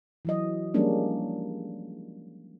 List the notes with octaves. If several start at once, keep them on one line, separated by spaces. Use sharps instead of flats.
E3 F#3 D#5
F3 G3 G#3 A#3 C#4 D4